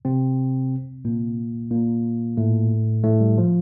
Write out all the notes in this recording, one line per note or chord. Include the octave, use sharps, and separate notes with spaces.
C3 C4
A#2 A#3
A#2 A#3
A2 A3
A2 A3
G3
F3